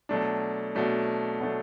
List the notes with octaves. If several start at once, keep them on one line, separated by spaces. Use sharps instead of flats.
B2 F#3 A3 D4
B2 F#3 A3 D4
B2 F#3 A3 D4